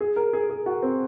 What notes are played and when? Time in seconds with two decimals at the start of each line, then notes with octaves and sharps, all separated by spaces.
0.01 G#4
0.16 A#4
0.33 G#4
0.50 G#4
0.66 F#4
0.82 C4